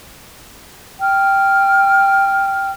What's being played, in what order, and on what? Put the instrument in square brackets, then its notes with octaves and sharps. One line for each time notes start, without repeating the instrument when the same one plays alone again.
[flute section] G5 F6